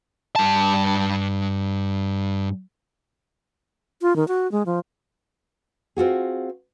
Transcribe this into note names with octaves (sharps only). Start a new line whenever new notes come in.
G2 A5
F4
D#3
F#4
G#3
F3
C4 F4 F#4 G#4